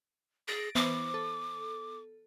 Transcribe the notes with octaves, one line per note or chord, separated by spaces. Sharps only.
G#4 A6 A#6 D7
E3 B3 C5 D6
A4